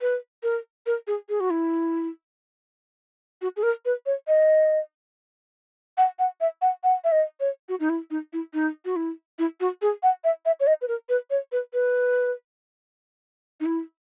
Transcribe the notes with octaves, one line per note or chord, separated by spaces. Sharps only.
B4
A#4
A#4
G#4
G#4
F#4
E4
F#4
G#4
A#4
B4
C#5
D#5
F#5
F#5
E5
F#5
F#5
E5
D#5
C#5
F#4
D#4
E4
D#4
E4
D#4
F#4
E4
E4
F#4
G#4
F#5
E5
E5
C#5
D#5
B4
A#4
B4
C#5
B4
B4
D#4
E4